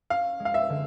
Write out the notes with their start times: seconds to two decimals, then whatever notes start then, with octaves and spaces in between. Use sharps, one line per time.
0.10 C#4 F5
0.40 G#3
0.45 F5
0.54 E5
0.69 D3